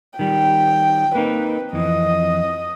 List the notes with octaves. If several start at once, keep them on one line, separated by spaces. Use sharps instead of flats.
D#3 G3 G5
A#3 C4 D#4 B4
F2 E3 C4 D#5